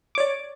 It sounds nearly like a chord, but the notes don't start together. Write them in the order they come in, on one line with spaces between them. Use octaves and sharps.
D6 C#5 D5